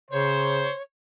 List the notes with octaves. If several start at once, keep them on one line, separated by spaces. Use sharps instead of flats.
C#3 C5 C#5